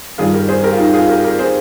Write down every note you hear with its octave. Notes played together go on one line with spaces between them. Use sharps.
G2 D#3 G3 F4 G#4
G4 A#4
G#4 C5
G4 A#4
F4
D#4 G4
F4 G#4
G4 A#4
G4 A#4
G#4 C5